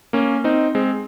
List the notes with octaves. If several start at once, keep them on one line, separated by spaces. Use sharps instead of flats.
A#3 C#4
C4 D#4
G#3 C4